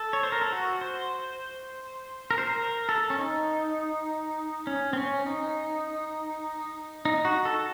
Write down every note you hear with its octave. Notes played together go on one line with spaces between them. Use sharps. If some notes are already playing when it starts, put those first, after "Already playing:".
Already playing: A4
C#5
C5
A#4
A4
F#4
C5
A#4
C5
A#4
A4
C#4
D#4
C#4
C4
C#4
D#4
D#4
F#4
A4